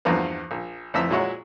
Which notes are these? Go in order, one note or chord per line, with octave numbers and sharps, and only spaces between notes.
E2 G2 F3 A#3 B3
A#1
A1 F2 E3 E5 E6
A#2 F#3 G#3 E4 C#5 F#5